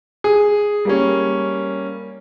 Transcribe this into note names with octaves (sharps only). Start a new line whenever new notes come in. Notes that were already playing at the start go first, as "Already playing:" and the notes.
G#4
G3 A#3 C#4